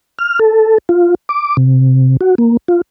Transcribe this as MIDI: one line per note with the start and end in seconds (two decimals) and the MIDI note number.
0.19 0.39 89
0.39 0.78 69
0.89 1.15 65
1.29 1.57 86
1.57 2.17 48
2.21 2.35 66
2.38 2.57 58
2.68 2.81 65